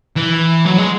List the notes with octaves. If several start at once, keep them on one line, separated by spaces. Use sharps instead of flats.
E3
F#3
G#3